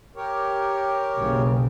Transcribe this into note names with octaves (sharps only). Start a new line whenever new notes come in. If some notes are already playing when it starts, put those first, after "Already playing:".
G4 A#4 C#5
F#1 B1 C#3